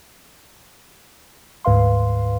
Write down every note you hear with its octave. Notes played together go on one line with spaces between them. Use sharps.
D2 G#2 B4 F5 C6